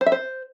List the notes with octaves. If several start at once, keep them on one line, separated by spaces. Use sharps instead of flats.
C5
E5
C5